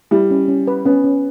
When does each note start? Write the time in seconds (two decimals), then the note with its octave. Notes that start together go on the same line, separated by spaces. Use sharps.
0.11 G3 E4
0.31 C#4
0.48 C#4
0.67 B4
0.85 B3 C#4
1.04 C#4